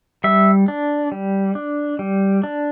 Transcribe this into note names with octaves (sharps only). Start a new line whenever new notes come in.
G3 E5
D4
G3
D4
G3
D4